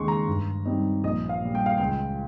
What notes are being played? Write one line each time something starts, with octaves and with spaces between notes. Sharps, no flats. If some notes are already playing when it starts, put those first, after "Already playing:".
Already playing: D#2 C#3 G#3 D#4 C6 C#6
A#5
G2
G3 C4 D#4
A#1 D#5
F5
A#2 G3
G5
F5
C#2 G5